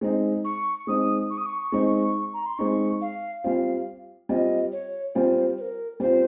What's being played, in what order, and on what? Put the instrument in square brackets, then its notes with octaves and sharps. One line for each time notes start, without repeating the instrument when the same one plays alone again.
[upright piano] G#3 C4 D#4
[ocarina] C#6
[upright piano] G#3 C4 D#4 [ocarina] D#6
[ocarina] C#6
D#6
C#6
[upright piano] G#3 C4 D#4
[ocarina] A#5
C6
[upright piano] G#3 C4 D#4 [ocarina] C#6
[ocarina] F5
[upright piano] G3 C4 F4 [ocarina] F5
[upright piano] G3 C4 F4 [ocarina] D#5
[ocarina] C#5
[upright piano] G3 C4 F4 [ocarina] C5
[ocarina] C5
A#4
[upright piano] G3 C4 F4 [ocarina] C5